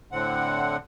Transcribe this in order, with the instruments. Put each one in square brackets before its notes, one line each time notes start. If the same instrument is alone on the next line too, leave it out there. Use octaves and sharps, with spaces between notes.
[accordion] A2 D3 C4 F#5